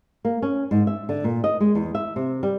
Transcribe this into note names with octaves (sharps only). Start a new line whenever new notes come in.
A#3
C#4
G#2
E5
D3
A#2
D#5
G#3
E2
E5
C3
G3